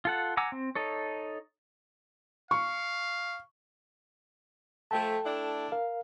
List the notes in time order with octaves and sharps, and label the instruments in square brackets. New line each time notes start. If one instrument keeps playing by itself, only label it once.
[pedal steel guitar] F4 A4 F#5
F#5 G#5 A#5 D6 E6
C4
D#4 A4 C#5
[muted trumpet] F5 [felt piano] C#6
[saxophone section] F3 A3 [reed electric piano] A4 G5 A5
[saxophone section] A3 D4 E4
[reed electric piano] A#4 F5